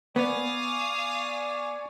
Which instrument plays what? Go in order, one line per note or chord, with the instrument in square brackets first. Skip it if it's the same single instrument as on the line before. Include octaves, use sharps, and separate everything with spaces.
[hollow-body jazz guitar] B3 [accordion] D5 G#5 C#6 [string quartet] F5 D#6